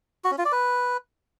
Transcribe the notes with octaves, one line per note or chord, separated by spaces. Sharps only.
F#4
C#4
F4
D5
B4